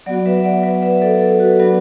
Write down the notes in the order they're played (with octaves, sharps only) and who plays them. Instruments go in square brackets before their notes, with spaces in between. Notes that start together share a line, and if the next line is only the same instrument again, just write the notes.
[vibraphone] F#3 B3 F#4 D5 F#5
B4 E5
D5 F#5
B4 E5
B4 E5
A4 D5
A4
F#4 B4
F#3 B3 D4 F#4 B4